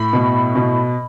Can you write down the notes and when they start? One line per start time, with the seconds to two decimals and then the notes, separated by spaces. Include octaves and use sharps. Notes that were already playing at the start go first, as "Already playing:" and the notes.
Already playing: A2 B5
0.13 B2
0.55 B2